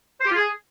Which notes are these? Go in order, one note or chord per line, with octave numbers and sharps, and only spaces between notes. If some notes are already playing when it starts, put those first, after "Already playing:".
C5
G4
F4
G#4